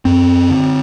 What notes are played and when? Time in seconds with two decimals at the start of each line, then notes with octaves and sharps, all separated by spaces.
0.05 F#2 C4
0.50 D3